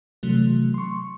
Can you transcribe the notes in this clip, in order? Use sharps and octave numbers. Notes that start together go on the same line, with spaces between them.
C3 E3 F#3 A3
C6 C#6